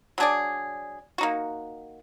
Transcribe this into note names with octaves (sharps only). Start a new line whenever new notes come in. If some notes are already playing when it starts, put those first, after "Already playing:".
F#3 D4 G#4 D5
A#3 D#4 F#4